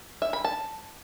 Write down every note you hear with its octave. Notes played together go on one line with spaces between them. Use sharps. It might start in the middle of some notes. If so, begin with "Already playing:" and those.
E5
B5
A5